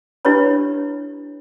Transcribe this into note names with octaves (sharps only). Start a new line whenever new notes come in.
D4 E4 G4 B4 C#5 B5